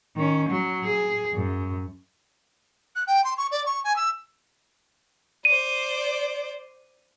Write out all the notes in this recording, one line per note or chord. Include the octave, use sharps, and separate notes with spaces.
D#3 C#4
F#3
G#4
F#2
F#6
G5
C6
C#6
D5
C#6
G#5
E6
C5 D5 D#7